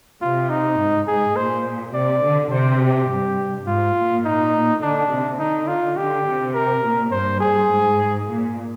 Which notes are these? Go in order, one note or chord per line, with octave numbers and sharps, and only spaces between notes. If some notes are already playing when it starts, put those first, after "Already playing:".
C3 F4
D#4
G#2
G#2 G#4
A#2 C5
C3 D5
D3
C3 C5
G4
G2
G#2 F4
A#2
D#4
D3 D4
C3
D3 D#4
F4
D3 G4
C3
A#4
A#2
G2 C5
G#4
G#2
A#2